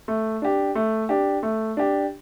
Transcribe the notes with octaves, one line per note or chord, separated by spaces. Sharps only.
A3
D4 G4
A3
D4 G4
A3
D4 G4